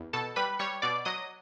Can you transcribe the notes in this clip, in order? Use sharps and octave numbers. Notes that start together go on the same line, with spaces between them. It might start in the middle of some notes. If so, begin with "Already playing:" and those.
Already playing: E2
B2 A4 A5
G3 B4 B5
G3 C#5 C#6
B2 D5 D6
F#3 D#5 D#6